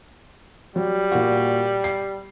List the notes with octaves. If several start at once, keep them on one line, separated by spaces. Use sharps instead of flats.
F#3 G3
A#2 F#4
C7